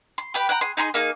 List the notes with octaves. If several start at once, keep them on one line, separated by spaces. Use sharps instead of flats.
C6
G4 B4 G5
F#5 G5 A#5
G#4 C6
D#4 G#4 A#5 C6
A#3 D#4 G#4